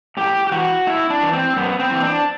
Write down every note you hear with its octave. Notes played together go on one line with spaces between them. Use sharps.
A2 G4
G4
E3 F#4
A2 E4
D4
E3
C4
F#2 B3
C4
E3
D4